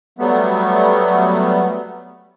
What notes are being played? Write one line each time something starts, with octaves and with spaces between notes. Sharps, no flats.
F#3 G3 A3 B3